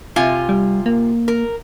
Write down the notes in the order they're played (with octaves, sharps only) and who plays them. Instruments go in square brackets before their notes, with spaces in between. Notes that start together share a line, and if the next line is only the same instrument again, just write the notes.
[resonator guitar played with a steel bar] C3 F4 G#5
[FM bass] G3
A#3
[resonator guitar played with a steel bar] A#4